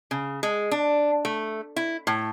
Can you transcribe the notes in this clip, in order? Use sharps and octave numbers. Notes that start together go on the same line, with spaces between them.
C#3
G#3
D4
A3
E4
A2